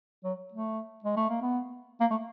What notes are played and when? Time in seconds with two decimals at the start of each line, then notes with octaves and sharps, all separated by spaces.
0.24 F#3
0.53 A3
1.04 G#3
1.16 A3
1.29 A#3
1.42 B3
2.00 A#3
2.10 A3